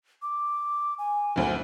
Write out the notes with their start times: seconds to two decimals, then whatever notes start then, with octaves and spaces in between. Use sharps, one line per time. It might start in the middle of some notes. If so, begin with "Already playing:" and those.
0.22 D6
0.98 G#5
1.36 F#1 D2 C5